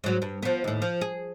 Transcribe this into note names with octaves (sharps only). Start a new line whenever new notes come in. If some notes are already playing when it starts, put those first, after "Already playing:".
G#2 F#3
G2
F3 B3
D#2 A2
F3
G#4